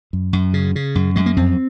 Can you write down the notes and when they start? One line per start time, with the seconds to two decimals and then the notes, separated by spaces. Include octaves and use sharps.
0.13 F#2
0.33 F#2
0.54 C#3
0.76 C#3
0.95 F#2
1.16 F#2 G#3
1.26 A#3
1.36 F2 C4